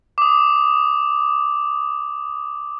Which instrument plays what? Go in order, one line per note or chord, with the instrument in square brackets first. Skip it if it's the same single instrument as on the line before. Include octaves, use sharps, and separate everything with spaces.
[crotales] D6 D#6